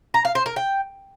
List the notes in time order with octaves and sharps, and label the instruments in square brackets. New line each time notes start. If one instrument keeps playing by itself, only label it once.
[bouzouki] A#5
F5
C5
A#4
G5